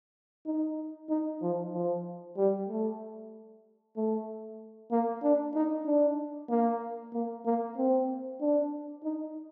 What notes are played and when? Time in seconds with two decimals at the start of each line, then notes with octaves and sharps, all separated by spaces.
0.46 D#4
1.09 D#4
1.41 F3
1.73 F3
2.37 G3
2.69 A3
3.96 A3
4.91 A#3
5.23 D4
5.55 D#4
5.86 D4
6.50 A#3
7.13 A#3
7.45 A#3
7.77 C4
8.41 D4
9.04 D#4